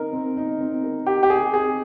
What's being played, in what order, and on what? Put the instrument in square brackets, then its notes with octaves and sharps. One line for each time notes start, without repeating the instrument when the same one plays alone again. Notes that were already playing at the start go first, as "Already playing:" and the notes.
Already playing: [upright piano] C4 D#4 A#4 D#5
C4
D#4
C4
A#4
[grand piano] G4 [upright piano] D#5
[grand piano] G4
[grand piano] G#4 [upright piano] A#4
[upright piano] C4 [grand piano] G#4